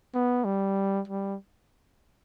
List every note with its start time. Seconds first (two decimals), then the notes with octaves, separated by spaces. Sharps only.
0.15 B3
0.45 G3
1.08 G3